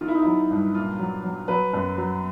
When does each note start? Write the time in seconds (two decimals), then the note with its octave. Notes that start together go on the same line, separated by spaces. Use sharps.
0.01 D#3 F4
0.08 E4
0.15 D#4
0.22 F#3 E4
0.51 G2
0.75 A#2 F4
0.99 F#3
1.24 F#3
1.48 F#3 B4
1.74 F#2
1.98 F#3